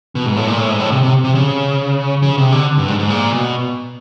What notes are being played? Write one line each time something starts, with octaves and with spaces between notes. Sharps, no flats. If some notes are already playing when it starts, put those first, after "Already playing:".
B2
G#2
A2
A#2
A2
G#2
A2
C3
C3
C3
C#3
C#3
C3
D3
G2
G#2
G#2
A#2
B2